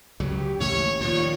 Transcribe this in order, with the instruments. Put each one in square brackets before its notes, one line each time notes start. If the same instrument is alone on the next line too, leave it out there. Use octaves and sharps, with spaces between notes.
[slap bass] C#2 C#3 F#3 [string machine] G4
[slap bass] A1 D#2 C#3 [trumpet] C#5 [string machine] C#6
[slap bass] A#2 F3 [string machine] D#3 F4 D5 [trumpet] C#5